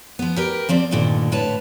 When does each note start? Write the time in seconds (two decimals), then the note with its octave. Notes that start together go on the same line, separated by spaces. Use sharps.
0.19 F3 B3
0.37 G4 A#4 B4
0.69 F3 A#3 C4 D5
0.91 D2 G2 A#2 D3 D#3
1.32 A2 D3 B4 C#5 A5